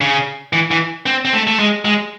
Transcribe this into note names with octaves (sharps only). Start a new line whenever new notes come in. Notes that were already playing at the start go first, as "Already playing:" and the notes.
C#3
E3
E3
C4
C4
A3
A3
G#3
G#3